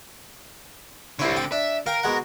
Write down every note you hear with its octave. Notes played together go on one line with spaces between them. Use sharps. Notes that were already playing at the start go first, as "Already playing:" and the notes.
C2 D3 C4 E4 C#5
G5
D4 E5
A#4 F5 G5
B2 G#3 F#5